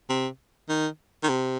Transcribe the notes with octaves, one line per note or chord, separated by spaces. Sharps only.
C3
D#3
D#3
C3